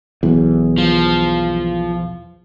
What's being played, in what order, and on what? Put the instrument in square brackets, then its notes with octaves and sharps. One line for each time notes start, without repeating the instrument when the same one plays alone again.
[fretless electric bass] B1 E2
[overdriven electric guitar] F3